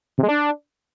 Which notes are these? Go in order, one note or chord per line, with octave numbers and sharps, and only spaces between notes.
C3
G#3
D4